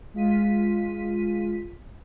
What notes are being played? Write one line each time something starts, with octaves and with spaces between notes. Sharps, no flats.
G#3 F4 B6 D#7